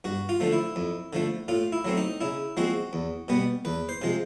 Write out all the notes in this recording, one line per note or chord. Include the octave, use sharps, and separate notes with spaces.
G2 F#4
F4
D3 F3 A3
E4
F2
D3 F3 A3
A2 F4
E4
F#3 A3 C4
D#4
C#3 E4
F3 G#3 C4 F#4
E2
B2 G3 B3
E2 B4
C5
C3 F3 G#3